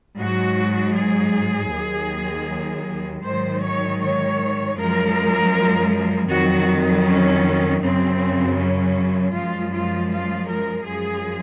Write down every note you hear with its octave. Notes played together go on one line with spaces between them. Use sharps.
G#2 F#3 F#4
G#4
D#2 D#3 F#3
G#2 D#3 F#3 C5
C#5
C#5
F#2 F3 G#3 A#4
F2 D#3 F#3 F#4
C#4
F#2 C#3 F#3 C4
C#4
F#2 F3 G#3 F4
F4
F4
A#4
F#2 F3 G#3 G#4